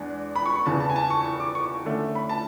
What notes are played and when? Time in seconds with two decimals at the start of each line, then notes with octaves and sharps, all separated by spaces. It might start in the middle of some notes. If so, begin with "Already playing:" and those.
Already playing: E2 G#3 D4
0.36 B5
0.46 C#6
0.56 C#6
0.66 E2 C#3 E3 A5
0.80 A5
0.90 G#5
0.96 A5
1.10 C#6
1.25 C#6
1.40 D6
1.55 C#6
1.85 D3 A3 C#4
2.15 B5
2.29 A5